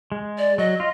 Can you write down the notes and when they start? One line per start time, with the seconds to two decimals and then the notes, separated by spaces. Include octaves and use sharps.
0.12 G#3
0.38 D5
0.58 F#3 D#5
0.80 F4